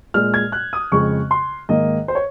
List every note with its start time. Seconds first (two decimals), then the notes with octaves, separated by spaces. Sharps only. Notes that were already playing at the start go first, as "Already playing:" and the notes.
0.14 A#2 G#3 F6
0.34 G#6
0.52 F#6
0.73 D#6
0.92 F2 C#3 G#3 C#6
1.31 C6
1.69 G#2 D#3 A#3 D#5
2.08 C5
2.15 C#5